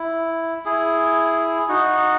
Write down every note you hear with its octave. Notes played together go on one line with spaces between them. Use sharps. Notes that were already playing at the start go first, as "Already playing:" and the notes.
Already playing: E4
E4 G#4
D#4 F#4